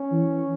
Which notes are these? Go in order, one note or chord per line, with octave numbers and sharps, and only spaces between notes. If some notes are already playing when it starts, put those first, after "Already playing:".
Already playing: C#4
E3